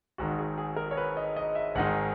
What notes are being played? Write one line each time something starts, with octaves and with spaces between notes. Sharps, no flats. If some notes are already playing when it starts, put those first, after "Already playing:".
G#1 G#2 D#3 F#4
G#4
G#4
A#4
C#5
B4
D#5
D#5
E5
G#1 G#2 D#3 G#3 D#4 F#5